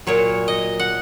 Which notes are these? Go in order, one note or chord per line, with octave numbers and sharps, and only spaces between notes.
A#2 F#3 C#5
D#5
F#5